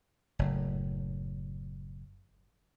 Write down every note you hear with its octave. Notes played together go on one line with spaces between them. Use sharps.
F#1 A2